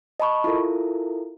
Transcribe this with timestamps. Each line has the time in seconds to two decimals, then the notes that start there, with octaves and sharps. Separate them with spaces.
0.20 D#5 A5 B5 C#6
0.44 E4 F4 A4 A#4